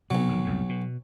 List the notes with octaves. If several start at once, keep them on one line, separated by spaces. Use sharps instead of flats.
B1 C3 F#3 B3
F1 D#3
C2 F2 A2
B2